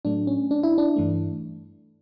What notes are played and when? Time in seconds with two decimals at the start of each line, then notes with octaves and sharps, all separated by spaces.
0.05 A2 F#3 A3 D4
0.27 C#4
0.51 D4
0.63 E4
0.78 D4
0.96 G2 E3 A3